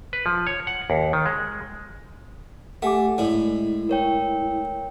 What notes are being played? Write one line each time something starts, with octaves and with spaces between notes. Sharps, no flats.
B4
F3
C#5
F#5
D#2
D#3
G#3
A3 G4 F#5 G#5 D6
A2 G#3 E4 D5
A#4 C#5 G5